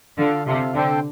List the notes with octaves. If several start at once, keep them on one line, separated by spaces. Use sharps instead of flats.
D3 F4 A4 F5
C3 F4 A4 F5
D3 C4 A4 C5 G5